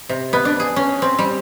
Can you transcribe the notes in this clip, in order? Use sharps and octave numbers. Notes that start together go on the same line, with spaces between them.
C3
B3
D4
G#4
C#4
C4
G3